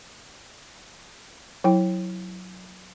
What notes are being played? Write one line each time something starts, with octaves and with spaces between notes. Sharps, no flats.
F#3 E4 G5